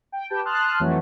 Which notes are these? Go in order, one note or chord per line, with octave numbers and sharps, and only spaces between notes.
G5
G4 B4 G5 A5
A5 C6 D#6 F6 F#6
F2 E3 F#3 A3